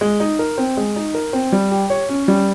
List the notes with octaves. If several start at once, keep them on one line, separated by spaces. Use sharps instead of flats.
G#3
D#4
A#4
C4
G#3
D#4
A#4
C4
G3
G4
C#5
C#4
G3